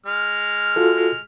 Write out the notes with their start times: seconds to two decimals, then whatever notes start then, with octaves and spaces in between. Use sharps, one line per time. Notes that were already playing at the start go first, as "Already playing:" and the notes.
0.06 G#3 F6
0.76 F4 F#4 A4